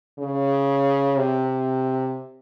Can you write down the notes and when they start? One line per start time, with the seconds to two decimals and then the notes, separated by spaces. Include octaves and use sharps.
0.19 C#3
1.17 C3